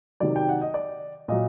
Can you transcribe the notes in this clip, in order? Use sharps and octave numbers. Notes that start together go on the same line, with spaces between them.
C3 D#3 F#3 D5
G5
F#5
D#5
D5
A#2 F#3 D#5